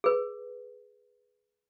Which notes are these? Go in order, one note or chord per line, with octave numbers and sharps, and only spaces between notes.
G#4 B4